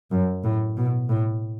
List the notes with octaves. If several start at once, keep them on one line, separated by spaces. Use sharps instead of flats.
F#2
A2
B2
A2